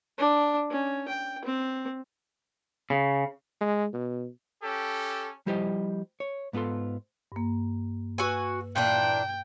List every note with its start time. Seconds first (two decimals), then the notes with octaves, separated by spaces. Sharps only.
0.18 D4
0.71 C#4
1.09 G5
1.45 C4
2.90 C#3
3.61 G#3
3.94 B2
4.63 C#4 G4 A4
5.46 F3 G3 E4 G4 C5 D#5
6.20 C#5
6.53 G#2 B3 F4 A4 C6
7.32 G2 A#3
8.18 F#4 B4 G#5 E6
8.76 A#2 E3 D4 G5